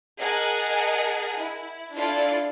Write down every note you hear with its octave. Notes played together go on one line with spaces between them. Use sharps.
G#4 A#4 D#5 F#5 G#5 A5
E4
D4 E4 F4 A4 D5